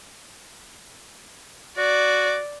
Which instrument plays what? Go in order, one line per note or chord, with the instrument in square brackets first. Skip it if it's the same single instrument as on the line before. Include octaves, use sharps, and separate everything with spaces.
[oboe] F#4 [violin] D5